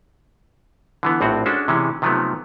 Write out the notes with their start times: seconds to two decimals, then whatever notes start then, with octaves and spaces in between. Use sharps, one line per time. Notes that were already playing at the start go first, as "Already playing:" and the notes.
1.03 D3 E3 B3
1.21 A#1 A2 C4 F#4
1.46 G#3 C#4 D4 F#4 A4
1.68 C3 E3 G#3 C#4
2.02 C3 D#3 F3 F#3 A3 B3